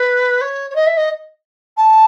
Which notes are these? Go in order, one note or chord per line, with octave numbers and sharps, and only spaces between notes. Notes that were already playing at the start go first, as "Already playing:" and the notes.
Already playing: B4
C#5
C#5
D#5
E5
D#5
A5